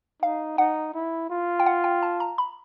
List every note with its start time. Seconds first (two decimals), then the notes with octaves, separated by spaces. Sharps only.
0.22 D#4 F5
0.58 D#4 F#5
0.94 E4
1.30 F4
1.60 G5
1.66 F#5
1.84 G5
2.02 A5
2.20 A#5
2.38 B5